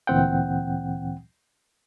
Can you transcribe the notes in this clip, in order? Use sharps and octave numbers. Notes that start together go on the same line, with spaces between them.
D2 A#2 E3 C4 F#5 G5